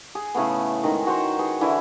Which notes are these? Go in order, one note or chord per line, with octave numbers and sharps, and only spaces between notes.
G#4
A2 C#3 A3 B3
D#3 G#3 G#5 A#5
F#4 C5 C#5
G#4 B4
D3 E3 E4